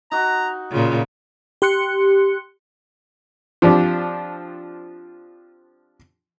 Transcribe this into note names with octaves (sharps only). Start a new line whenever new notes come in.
D#4 F#4 A#5
A#2 C#3 F4
G4 C6 F#6 C#7
F3 C4 D4 G4